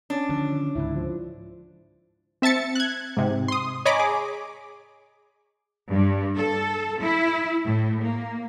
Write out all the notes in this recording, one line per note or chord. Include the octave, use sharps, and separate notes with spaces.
C#4 D4
D3 D#3 F3
C#2 G#2 D3 E4
F3
C4 E5 A5 A6 C#7
F#6 G#6
G#2 C3
C6 D#6
C#5 D#5 G#5 A#5 B5 D6
G#4 D6
G2
A4
E4
A2
A#3